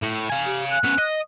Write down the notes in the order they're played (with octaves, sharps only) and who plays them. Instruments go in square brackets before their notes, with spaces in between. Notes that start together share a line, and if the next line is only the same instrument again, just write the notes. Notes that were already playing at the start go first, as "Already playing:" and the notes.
[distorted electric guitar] A2
F5 G#5
[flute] G4
F#6
[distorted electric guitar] B3 C#4
D#5